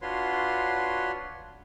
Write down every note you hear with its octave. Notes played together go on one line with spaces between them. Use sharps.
D4 F4 F#4 B4 C#5 C6